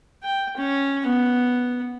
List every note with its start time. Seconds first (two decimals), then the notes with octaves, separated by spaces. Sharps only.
0.24 G5
0.57 C#4
1.06 B3